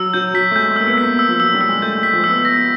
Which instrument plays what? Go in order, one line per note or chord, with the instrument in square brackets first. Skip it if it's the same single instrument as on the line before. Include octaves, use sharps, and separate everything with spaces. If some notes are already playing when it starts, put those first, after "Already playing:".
Already playing: [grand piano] F#3 [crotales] E6
[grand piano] F#3 [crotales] G6
[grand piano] F#3 [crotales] B6
[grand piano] A3
[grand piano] G#3 [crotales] G6
[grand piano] A3
[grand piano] A#3 [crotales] E6
[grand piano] B3
[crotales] B6
[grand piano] A#3
[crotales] E6
[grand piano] F3
[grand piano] F#3 [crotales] E6
[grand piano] G3
[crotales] E6
[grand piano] G#3
[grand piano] A3 [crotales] G6
[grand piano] G#3
[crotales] B6
[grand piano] F3
[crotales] E6
[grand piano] B3
[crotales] A#6